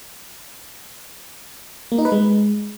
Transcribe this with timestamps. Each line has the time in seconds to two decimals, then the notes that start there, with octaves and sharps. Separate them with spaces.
1.92 A#3
1.98 D#4
2.05 B4
2.12 G#3